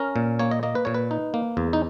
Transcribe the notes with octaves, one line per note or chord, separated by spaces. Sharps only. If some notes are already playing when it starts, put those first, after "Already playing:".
Already playing: C#4 A#4
A#2
A#3 C#5
D#5
A#3 D#5
B4
A#2 C#5
B4
D#4
A#3
E2
D#4